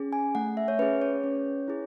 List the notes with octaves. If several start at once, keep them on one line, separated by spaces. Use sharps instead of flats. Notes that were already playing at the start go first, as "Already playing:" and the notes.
Already playing: C#4 G#4
G#5
A3 F#5
E5
C#5
C#4 G#4 B4
C#5
C#4
E4 G#4